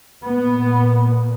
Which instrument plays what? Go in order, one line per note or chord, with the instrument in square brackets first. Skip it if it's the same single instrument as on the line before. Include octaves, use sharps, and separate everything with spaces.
[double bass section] A#2 B3